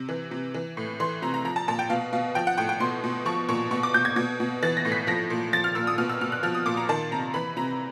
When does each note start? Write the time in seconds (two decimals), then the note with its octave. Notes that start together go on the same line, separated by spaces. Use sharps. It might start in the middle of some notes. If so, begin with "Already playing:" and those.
Already playing: C3
0.09 E3
0.31 C3
0.54 E3
0.77 A2
1.00 E3 C6
1.22 C3 A#5
1.34 A#5
1.45 F3 A#5
1.56 A5
1.68 A#2 A5
1.79 G5
1.90 B2 F5
2.13 B2 F5
2.35 F3 G5
2.47 F#5
2.58 A2 G5
2.69 G5
2.80 B2 C6
3.04 B2
3.26 F3 C#6
3.49 A#2 C#6
3.71 B2 C#6
3.83 D6
3.94 B2 G6
4.05 G#6
4.16 B2 G#6
4.40 B2
4.63 E3 A6
4.77 A#6
4.85 A2
4.92 B6
5.07 F3 A#6
5.30 A#2
5.53 F3 A6
5.64 F6
5.75 A#2 E6
5.87 D#6
5.98 B2 F6
6.09 E6
6.21 B2 F6
6.32 F#6
6.43 F3 F6
6.55 D#6
6.66 A#2 D6
6.77 A#5
6.89 D#3 A5
7.11 C3 A#5
7.34 E3 B5
7.57 C3 A#5